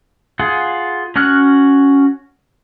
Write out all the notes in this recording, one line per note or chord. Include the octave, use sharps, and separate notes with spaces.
F4 G#4 F#5
C#4 F#4 F6 F#6